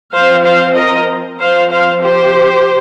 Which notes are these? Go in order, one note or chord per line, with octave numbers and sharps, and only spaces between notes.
F3 C4 C5 F5
C5 F5
A#4 D#5
F3 C4 C5 F5
C5 F5
G4 C5